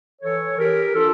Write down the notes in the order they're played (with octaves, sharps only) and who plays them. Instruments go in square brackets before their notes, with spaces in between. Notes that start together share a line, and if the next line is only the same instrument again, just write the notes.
[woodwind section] E3 A4 C#5
E3 G4 A#4
D4 F4 A4